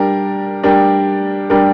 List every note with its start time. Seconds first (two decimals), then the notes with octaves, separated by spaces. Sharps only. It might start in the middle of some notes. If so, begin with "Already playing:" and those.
Already playing: G3 D4 G4 A#4
0.63 G3 D4 G4 A#4
1.50 G3 D4 G4 A#4